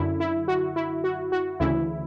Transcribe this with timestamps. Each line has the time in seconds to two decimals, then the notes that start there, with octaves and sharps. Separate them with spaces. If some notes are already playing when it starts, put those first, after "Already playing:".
Already playing: F#2 D3 E4
0.20 E4
0.48 F#4
0.76 E4
1.04 F#4
1.32 F#4
1.60 D2 C#3 E3 E4